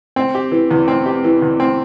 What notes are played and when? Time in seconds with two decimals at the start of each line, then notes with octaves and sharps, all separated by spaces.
0.16 C4
0.35 G4
0.51 E3
0.71 E2
0.88 C4
1.06 G4
1.24 E3
1.42 E2
1.60 C4